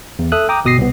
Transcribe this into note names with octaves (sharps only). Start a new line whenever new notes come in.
E2
A4 E5 D#6 E6 F#6
G5 A#5 D6 D#6
G1 B2 D#6 A#6 C7
C2 B3